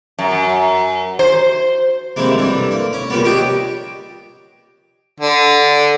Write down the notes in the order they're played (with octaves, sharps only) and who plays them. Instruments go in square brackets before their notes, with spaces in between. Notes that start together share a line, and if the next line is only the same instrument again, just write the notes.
[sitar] F#2
C5
[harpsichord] C3 D#3 E3 G#3 A#3
G2 D3 E3
A#3
C#4
A#2 C#3 G3 A#3 B3
C#4 D4 G4 D#5 G5
[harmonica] D3